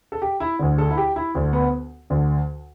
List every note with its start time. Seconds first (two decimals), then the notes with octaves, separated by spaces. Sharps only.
0.12 A4
0.22 G4
0.40 E4
0.59 D2 D3
0.78 A4
0.90 E4
0.97 G4
1.16 E4
1.35 D2 D3
1.53 B3
2.10 D2 D3